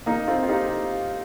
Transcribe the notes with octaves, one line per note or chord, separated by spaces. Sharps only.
A#3 D#4
C4 F4
F4
D#4 G4